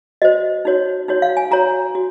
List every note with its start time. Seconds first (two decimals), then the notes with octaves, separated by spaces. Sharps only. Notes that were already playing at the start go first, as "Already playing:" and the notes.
0.22 F#4 C5 D#5
0.65 D#4 F#4 C#5
1.08 D#4 F#4 C#5
1.22 F5
1.37 G#5
1.51 F#4 C#5 A#5
1.95 F#4